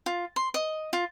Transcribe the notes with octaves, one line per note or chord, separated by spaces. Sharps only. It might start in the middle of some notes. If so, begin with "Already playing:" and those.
F4
C6
D#5
F4